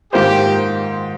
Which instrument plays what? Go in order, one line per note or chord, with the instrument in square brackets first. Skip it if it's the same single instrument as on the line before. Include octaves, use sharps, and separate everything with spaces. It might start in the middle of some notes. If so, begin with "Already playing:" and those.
[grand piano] G#2 D#3 A#3 F4 C5 [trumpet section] G4